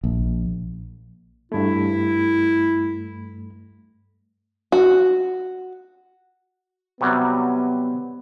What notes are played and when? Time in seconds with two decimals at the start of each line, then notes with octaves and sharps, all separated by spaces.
0.04 A#1
1.52 G2 A3 E4
4.72 F#4
7.01 C3 F#3 G3 B3